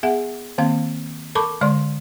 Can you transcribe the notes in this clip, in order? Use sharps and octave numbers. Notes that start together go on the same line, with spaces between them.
B3 G#4 E5 F#5
D#3 A#3 C4 F5
A4 A#4 A5 B5 C#6 D6
D3 G#3 D5 C6